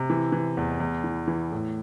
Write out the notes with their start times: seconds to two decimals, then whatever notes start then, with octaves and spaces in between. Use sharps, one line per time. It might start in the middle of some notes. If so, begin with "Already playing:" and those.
Already playing: C3
0.10 E3
0.32 E3
0.57 E2
0.80 E2
1.04 E3
1.28 E3
1.52 A2